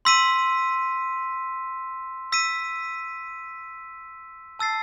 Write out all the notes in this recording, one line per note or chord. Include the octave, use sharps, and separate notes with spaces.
C6 E6 B6 D#7
E6 B6 D#7
A5 E6 A6 C7